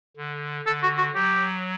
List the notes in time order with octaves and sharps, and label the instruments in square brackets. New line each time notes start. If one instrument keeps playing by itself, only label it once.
[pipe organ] D3
[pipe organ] D3 [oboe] A4
[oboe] F#4
F#4
[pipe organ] F#3 [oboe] G4